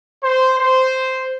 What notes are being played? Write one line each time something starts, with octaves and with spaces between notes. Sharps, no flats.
C5
C5